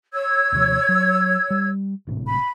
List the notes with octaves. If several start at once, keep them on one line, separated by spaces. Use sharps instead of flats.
C#5 E6 G#6
D#2 C3 F3
F#3
G3
G#1 A2 C3
B5